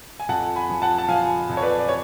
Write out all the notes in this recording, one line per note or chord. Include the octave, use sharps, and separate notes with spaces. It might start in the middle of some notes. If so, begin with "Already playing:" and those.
G#5
F2 F#5 A5
G#5 B5
F3
F#5 A5
A5
F3 F5 G#5
F2
C#5
B4 D5
D5
C#5